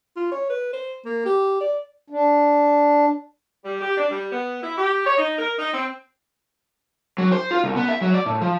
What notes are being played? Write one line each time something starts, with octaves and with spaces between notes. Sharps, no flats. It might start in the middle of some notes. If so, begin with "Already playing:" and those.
F4
C#5
B4
C5
A#3
G4
D5
D4
G3
G4
D4
G3
B3
E4
G4
C#5
D#4
A#4
D#4
C4
F#3
C5
F4
C2
B3
E5
F#3
D5
A2
F3